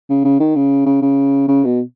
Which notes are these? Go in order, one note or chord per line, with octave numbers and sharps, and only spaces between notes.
C#3
C#3
D#3
C#3
C#3
C#3
C#3
B2